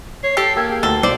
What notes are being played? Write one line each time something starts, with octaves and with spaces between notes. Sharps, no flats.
C#5 C7
G4 A4
A#3 G5 E6 G#6
G#4 G5
D2 D#3 A4 G7
B1 C5 D5